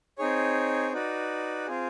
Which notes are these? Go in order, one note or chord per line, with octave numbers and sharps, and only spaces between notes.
C4 D#4 G#4 C#5
D#4 F#4 B4 D5
C4 F4 G#4